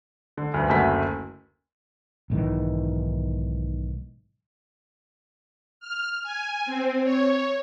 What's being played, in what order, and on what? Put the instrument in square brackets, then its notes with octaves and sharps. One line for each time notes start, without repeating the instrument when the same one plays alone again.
[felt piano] D3
D2 G2
F#1 D2 A3 F#4 B6
[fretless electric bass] B1 G#2 D#3 E3
[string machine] F6
G#5
C4
C#5